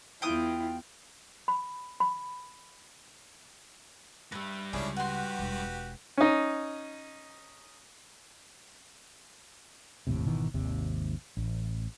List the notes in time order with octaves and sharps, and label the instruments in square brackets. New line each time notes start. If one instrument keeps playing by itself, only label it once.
[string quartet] E2 F4 [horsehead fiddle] E4 [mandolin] G5 D#6
[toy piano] B5
B5
[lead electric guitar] G2 G3 [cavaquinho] B4 E5
[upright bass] C#2 C#3 [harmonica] C#4 D4 E4 [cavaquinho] G#4 F5
[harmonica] F#4 G4 B4 [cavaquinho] F#5 C6
[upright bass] E1
[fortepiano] C#4 D#4
[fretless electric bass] G1 D#2 A2 C3
G#1 B2 D#3 E3
G#1 D#2 C3
A1